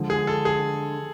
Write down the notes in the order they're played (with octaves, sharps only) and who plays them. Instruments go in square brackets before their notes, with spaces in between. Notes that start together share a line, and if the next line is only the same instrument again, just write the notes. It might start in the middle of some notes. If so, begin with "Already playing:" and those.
Already playing: [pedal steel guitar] D3 F3 G#3
[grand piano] G#4
A4
G#4